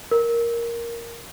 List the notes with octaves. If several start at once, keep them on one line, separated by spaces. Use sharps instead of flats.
A#4